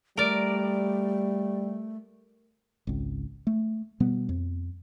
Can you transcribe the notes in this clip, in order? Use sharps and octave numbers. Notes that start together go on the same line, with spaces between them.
G3 A3 A#4 D5
G#1 C#2
A3
B2 G3 B3
F2